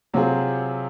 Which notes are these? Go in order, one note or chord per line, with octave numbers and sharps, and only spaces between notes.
C3 F#3 C4 F4 G#4